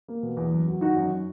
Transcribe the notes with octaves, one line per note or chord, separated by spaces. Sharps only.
A#3
B2
E2
F#2
F#3
D#3 D#4 F#4
F#2